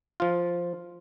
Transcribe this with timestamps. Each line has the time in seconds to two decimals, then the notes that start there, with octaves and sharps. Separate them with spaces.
0.20 F3 F4